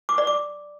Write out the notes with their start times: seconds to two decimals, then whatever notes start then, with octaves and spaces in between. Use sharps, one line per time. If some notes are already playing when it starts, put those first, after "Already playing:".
0.09 D6
0.18 D5
0.27 D6